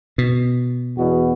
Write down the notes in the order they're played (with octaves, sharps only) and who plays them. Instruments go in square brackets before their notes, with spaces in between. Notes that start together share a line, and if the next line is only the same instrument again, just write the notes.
[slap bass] B2
[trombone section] E2 B2 F#4